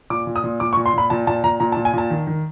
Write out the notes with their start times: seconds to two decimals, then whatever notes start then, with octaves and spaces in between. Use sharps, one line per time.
0.10 A#2 D6
0.27 A#2
0.36 D#6
0.44 A#2
0.60 A#2 D6
0.73 C#6
0.77 A#2
0.86 C6
0.93 A#2 B5
1.10 A#2 A5
1.27 A#2 A5
1.44 A#2 A#5
1.60 A#2 A#5
1.72 A5
1.77 A#2
1.85 G#5
1.93 A#2 A5
2.10 D#3
2.27 D#3